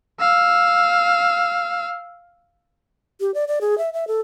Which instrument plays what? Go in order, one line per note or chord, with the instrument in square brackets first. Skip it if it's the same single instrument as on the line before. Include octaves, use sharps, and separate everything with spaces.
[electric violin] F5 E6
[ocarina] G4
D5
D5
G#4
E5
E5
A4